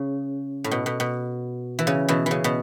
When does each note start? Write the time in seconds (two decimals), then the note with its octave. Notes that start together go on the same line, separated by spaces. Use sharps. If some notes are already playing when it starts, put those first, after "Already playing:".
Already playing: C#3
0.64 A2
0.71 B2
0.86 B2
1.00 B2
1.79 E3
1.87 C#3
2.08 B2 E3
2.26 C#3 E3
2.44 B2